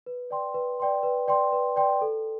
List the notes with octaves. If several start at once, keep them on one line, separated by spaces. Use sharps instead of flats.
B4
D5 G5 C6
B4
D5 G5 C6
B4
D5 G5 C6
B4
D5 G5 C6
A4